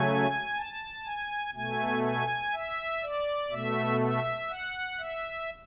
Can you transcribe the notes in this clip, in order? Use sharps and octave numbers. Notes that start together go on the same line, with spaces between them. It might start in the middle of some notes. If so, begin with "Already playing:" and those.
Already playing: C#3 F#3 A3 G#5
A5
G#5
B2 A3 G#5
G#5
E5
D5
B2 A3 E5
E5
F#5
E5